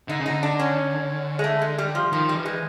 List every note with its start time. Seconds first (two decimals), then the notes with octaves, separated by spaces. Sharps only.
0.08 D3 D#4
0.20 C#3
0.26 D3 D#4
0.43 D4
0.59 C#4
1.39 G#3
1.44 A3
1.62 G#3
1.78 G3
1.95 F3
2.12 D#3 F3
2.29 G3
2.35 E3
2.45 G#3